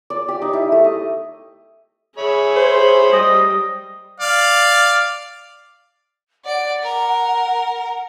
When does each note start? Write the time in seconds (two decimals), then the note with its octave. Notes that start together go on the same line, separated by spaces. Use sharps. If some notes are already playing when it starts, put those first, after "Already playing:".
0.10 D5
0.28 G4
0.42 D#4
0.53 E4
0.72 A3
0.84 D#5
2.18 G#4 C#5 E5 B5
2.56 C5
3.13 G3 D#5 G5 D#6
4.20 D5 F5
6.45 D5 F#5 D7
6.83 A#4